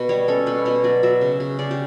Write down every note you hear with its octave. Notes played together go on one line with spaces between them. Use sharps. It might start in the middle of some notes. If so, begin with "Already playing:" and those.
Already playing: B2 B4
G3 C#5
C#4 A4
B2 B4
B2 C#5
F#3 D5
F#3 E5
C#3
C#3
C#3 D5
G4